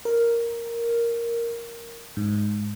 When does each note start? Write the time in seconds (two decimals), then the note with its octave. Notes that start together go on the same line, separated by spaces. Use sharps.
0.05 A#4
2.17 G#2